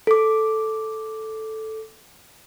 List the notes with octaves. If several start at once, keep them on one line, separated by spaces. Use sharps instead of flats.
A4 D6